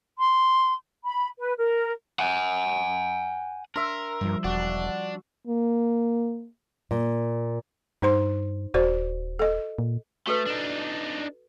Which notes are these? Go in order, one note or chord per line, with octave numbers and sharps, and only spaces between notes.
C6
B5
B4
A#4
F#5 G#5
D4 A#4 E5 C6
G2 F3 G3
E1 D4 F#4
A#3
A#2
G2 D#4 C5 C6
D#1 F#4 C5 D5
A4 D#5
A#2
A3 F#4 A4 B4
D4 D#4